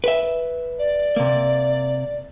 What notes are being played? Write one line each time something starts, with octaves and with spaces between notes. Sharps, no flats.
B4 E5
D5
C3 A#3